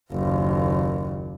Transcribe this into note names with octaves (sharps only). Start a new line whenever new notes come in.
F#1 D#2